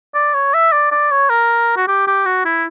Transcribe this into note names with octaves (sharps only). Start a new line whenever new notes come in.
D5
C#5
E5
D5
D5
C#5
A#4
F#4
G4
G4
F#4
E4